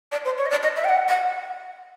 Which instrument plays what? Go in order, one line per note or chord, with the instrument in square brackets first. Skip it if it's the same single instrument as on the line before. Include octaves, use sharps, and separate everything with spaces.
[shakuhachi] D5
C5
C#5
D#5
D5
D#5
E5
G5
F#5
F#5